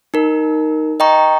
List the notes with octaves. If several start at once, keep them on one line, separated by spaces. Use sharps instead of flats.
D#4 A#4
D#5 G5 A#5 C#6